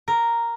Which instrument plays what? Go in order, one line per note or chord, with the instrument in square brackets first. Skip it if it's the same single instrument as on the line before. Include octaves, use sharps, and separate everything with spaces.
[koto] A#4